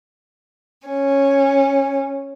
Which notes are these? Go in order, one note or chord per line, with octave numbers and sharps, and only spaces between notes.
C#4